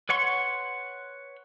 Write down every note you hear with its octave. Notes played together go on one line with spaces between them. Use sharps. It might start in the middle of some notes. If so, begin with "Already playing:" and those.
B4 C#5 F#5 C6 C#6